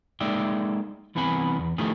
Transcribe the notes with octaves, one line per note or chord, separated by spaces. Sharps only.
G#3 A#3 D#4 D5 E5 G5
C2 E3 B3 C4 G#5 B5
E2
D#3 F3 A3 E4 G4 G#4